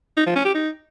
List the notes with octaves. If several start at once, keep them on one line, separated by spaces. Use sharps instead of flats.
D#4
F3
C#4
G4
D#4